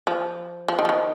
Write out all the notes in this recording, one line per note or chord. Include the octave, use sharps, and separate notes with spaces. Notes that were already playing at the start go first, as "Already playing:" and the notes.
F3
F3
D#3
F3
D#3